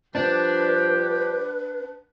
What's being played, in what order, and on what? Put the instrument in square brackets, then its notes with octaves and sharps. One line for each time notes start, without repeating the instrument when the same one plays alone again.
[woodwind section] F3 G3 G4 [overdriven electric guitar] D4 [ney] B4